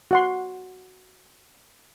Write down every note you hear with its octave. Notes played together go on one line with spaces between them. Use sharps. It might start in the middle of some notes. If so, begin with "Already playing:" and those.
F#4 F#5 C6